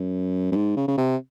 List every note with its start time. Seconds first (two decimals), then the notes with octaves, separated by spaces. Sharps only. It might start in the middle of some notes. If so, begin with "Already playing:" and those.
Already playing: F#2
0.52 F#2
0.56 G#2
0.77 C#3
0.88 C#3
0.98 C3